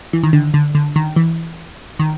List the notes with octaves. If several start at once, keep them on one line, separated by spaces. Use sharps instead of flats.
E3
D#3
D3
D3
D3
D#3
E3
D#3